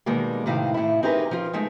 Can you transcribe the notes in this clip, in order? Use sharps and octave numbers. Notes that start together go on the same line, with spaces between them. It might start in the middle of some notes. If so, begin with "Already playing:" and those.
B2 D#3 G3 G#3 A#3
A2 C3 D#3 E4 F5
A2 E4
C4 D#4 G4 G#4 A#4 B4
F3 F4
G#3 A3 D#4